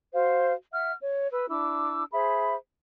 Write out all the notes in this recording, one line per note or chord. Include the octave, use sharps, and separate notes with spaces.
F#4 C5 F5
E5 F#5 F6
C#5
B4 E6
D4 E4 D6 E6
G#4 C5 E5 B5